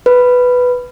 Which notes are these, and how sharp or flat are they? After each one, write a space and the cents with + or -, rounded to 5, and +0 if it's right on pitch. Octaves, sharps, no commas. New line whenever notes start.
B4 +5